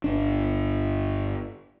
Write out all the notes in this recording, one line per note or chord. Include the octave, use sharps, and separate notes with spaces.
G1 D4